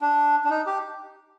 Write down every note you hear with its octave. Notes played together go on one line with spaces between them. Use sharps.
D4
D4
D#4
G4